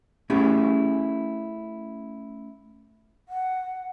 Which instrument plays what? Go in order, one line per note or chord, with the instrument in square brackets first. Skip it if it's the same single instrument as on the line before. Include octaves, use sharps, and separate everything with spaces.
[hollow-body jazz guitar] A3 C#4 E4 G4 G#4
[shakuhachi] F#5